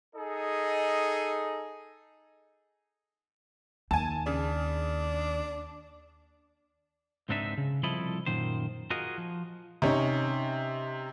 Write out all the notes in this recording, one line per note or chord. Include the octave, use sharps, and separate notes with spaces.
D#4 G#4 A4 D#5
D#2 G#5 A5
C#3 D4
C#2 G#2 C4 D4 D#4 E5
C#3
C2 F3 E4 A4 D#5 B5
F#2 A#2 D#3 C5
F4 F#4 G#4 A#4 D#5
F3
C3 C#4 D#4